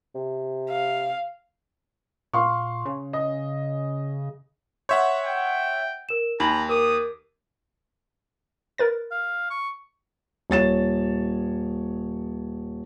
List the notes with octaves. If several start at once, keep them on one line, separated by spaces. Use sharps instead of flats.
C3
F5
A#2 F5 C6 C#6
C#3
D#5
C#5 E5 F#5 C6 C#6 G6
G5
A#4 E7
D#2 D#4 A#5 B5 F#7
A#4 D6 D#6 D#7
A#4 B4 A6
F5
C#6
D#1 C#5 A6 E7